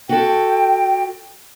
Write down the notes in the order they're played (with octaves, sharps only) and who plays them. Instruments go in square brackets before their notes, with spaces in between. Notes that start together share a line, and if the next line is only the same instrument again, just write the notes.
[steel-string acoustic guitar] F#4 A4 [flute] G5